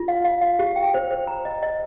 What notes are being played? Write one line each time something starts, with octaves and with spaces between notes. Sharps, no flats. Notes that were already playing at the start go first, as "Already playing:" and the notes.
Already playing: F4
F5
F5
F5
G4
G5
C5
C5
A#5
D#5
D#5